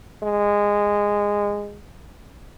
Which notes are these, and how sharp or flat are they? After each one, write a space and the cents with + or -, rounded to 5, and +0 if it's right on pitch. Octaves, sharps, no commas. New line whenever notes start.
G#3 -15